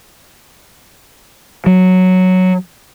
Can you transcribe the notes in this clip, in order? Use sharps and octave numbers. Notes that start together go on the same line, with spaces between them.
F#3